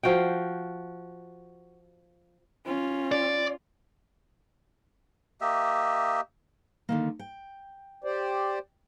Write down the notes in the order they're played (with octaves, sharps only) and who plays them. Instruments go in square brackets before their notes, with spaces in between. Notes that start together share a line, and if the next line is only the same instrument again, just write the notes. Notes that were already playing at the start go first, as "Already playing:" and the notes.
[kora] F3 F#4 F5 G5
[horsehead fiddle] C#4 F4
[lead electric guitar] D5
[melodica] A#3 G4 D#5 E5
[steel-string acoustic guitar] D3 D#3 A#3
G5
[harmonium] G4 C5 D5